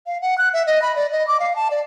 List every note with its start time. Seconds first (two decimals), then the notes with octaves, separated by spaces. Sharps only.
0.07 F5
0.21 F#5
0.38 F#6
0.53 E5
0.67 D#5
0.82 B5
0.96 D5
1.12 D#5
1.27 D6
1.40 F5
1.56 A5
1.71 D5